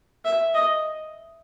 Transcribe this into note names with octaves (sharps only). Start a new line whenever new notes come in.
E5
D#5